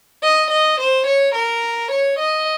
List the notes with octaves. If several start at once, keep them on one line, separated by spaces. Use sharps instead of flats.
D#5
D#5
C5
C#5
A#4
C#5
D#5